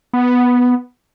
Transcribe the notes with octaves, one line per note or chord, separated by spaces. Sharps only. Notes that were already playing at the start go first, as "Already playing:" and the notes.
B3